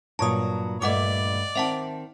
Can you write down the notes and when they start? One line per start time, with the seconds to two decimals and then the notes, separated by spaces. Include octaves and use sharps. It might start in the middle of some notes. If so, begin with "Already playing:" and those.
0.19 G2 A#2 F#3 C#5 A5 A#5 D#6
0.82 G2 A3 D5 D#5 F#5 D6
1.55 D#3 C4 E5 F#5 A5